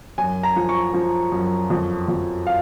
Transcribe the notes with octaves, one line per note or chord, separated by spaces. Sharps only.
F#2 G#5
A#5
F3
C#6
F3
F#2
F2
F2
F5